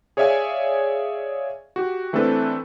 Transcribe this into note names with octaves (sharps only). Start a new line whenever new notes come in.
G#4 C#5 D5 E5 F5 G#5
F#4 G4
E3 A3 C4 D4 A4 B4